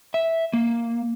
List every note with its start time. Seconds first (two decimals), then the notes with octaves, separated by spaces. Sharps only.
0.14 E5
0.53 A#3